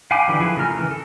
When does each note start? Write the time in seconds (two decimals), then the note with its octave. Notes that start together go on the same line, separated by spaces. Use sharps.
0.11 F5 G5 G#5 B5 D6
0.28 D3 E3 F#3
0.40 F3 E4 G#4 B4
0.57 C#3 A3 A#4 F6
0.79 E3
0.91 A4